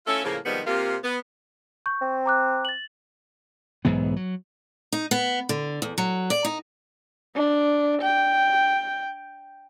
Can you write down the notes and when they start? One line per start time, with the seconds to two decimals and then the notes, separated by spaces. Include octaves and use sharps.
0.07 A3 C#4 E4 F4 A4
0.24 A2 C#3 F3 A#3
0.45 C3 D#3 F3 G3 G#3 B3
0.66 C3 A#3 F4
1.04 B3
1.86 C#6 G6
2.01 C4
2.26 A#5 D6 F#6
2.65 A6 F#7
3.85 B1 G#2 E3 B3
4.16 F#3
4.92 D#4
5.11 B3
5.49 D3
5.82 E2
5.98 F#3
6.30 D5
6.45 D#4
7.36 D4
8.02 G5